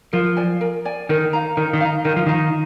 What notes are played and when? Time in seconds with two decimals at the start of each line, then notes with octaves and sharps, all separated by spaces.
0.13 F3 A#4
0.37 D5 G#5
0.61 A#4
0.85 D5 G#5
1.09 D#3 A#4
1.33 F5 A#5
1.57 D#3 A#4
1.73 D#3
1.80 F5 A#5
2.04 D#3 A#4
2.16 F3
2.26 D#3 F5 A#5